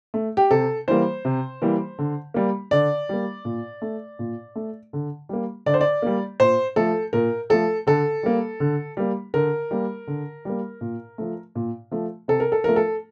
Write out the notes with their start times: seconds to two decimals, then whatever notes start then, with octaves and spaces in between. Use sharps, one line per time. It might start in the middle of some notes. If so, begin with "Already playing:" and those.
0.14 A3
0.37 G4
0.51 C3 A4
0.88 E3 G3 A#3 C5
1.25 C3
1.62 E3 G3 A#3
1.99 D3
2.34 G3 A#3
2.71 D3 D5
3.09 G3 A#3
3.45 A#2
3.82 A3
4.19 A#2
4.55 A3
4.93 D3
5.29 G3 A#3
5.66 D3 D5
5.74 C5
5.81 D5
6.02 G3 A#3
6.40 A#2 C5
6.76 F3 A3 A4
7.13 A#2 A#4
7.50 F3 A3 A4
7.87 D3 A4
8.23 G3 A#3
8.60 D3
8.97 G3 A#3
9.34 D3 A#4
9.71 G3 A#3
10.07 D3
10.45 G3 A#3
10.81 A#2
11.18 F3 A3
11.55 A#2
11.91 F3 A3
12.28 C3 A4
12.40 A#4
12.52 A4
12.64 F3 A3 A#4
12.76 A4